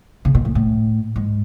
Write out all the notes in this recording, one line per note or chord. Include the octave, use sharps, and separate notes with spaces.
C#3
B2
A2
A2
G#2